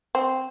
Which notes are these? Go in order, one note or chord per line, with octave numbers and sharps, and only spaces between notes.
C4